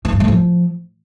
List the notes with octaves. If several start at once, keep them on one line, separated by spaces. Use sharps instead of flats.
D#3
G2
A2
F3